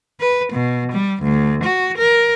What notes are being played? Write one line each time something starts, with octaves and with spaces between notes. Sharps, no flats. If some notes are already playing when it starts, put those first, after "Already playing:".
B4
B2
G3
D2
F#4
A#4